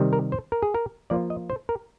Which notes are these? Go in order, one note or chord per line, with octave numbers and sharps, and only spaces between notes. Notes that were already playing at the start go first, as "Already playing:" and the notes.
Already playing: C3 D#3 G3
A#4
C5
A#4
G#4
A#4
F3 A#3 F4 D5
D#5
C5
A#4